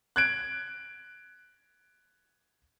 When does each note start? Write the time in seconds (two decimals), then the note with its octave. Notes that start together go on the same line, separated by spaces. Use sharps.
0.16 F#6 G#6 D7